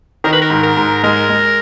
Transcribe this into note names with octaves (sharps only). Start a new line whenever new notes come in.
D#3 A#4
B4
A#4
G#2
A#4
G#2
G#3 A#4
G#3